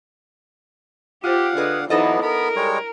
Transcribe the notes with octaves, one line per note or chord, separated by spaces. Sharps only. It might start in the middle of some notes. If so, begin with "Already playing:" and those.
F4 G4 C5 F5 F#5
D3 G#4 B4 D#5
E3 F#3 B3 D#4 A4 C5 D#5
B3 A#4 B5
G3 G#3 C#5